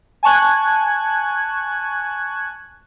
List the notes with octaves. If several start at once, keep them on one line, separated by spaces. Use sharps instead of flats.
G#5 A5 C#6 F#6 G#6